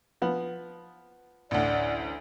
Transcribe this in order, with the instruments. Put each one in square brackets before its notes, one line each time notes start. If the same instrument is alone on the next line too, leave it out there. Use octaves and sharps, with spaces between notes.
[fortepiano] F3 B3
[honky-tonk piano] A1 D2 [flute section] D5 F#5